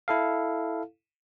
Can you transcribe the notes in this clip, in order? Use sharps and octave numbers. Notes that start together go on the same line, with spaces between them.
E4 A4 F5